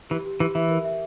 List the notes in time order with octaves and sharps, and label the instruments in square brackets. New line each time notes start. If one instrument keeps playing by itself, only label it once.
[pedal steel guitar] E3 [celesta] G4
[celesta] G4
[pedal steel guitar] E3 [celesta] G4
[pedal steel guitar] E3 [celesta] E5
[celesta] A#4
E5